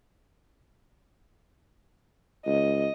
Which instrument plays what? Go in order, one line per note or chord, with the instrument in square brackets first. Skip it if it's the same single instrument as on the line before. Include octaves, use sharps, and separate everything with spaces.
[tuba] C#2 [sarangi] D#5